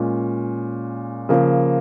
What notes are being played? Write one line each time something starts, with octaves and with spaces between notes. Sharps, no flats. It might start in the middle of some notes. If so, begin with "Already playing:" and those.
Already playing: A#2 G#3 C#4
C#3 F3 A#3